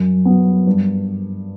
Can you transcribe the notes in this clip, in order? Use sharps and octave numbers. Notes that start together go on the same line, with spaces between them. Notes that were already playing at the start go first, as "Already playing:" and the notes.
Already playing: F#2
F#3 B3
G2